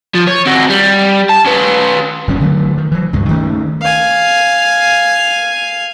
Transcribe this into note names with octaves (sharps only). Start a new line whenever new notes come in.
F3
C#5
C4 F#4
G3
A5
C#4 B4
F#1 G3 C#4
D3 E3 F#3 A3
D#3
E3 F#3
C#2 G2 G#3
D#3 A3 C#4
F5 G#5